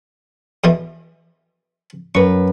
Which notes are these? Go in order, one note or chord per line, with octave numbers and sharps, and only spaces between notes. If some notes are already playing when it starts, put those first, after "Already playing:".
E2 B2 E3
F#2 B4 C#6